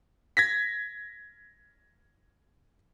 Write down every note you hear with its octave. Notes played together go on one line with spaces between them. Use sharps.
G#6 A#6 B6